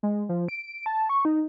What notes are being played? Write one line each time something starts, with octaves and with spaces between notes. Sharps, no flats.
G#3
F3
D7
A5
C#6
D#4